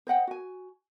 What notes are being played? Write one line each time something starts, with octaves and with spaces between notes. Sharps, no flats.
C5 D#5 F#5 G5
F#4 G#5